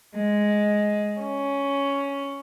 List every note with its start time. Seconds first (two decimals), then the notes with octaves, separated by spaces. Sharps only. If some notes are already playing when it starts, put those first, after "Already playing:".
0.16 G#3
1.23 C#4